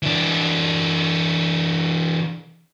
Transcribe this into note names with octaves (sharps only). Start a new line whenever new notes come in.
E3 D4